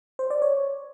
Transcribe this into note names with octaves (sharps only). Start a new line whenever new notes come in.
C5
D5
C#5